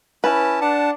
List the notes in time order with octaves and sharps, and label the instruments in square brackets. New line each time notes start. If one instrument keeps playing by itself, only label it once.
[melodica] C#4 E4 A5 [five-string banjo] B4
[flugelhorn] D4 [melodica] F#5 A5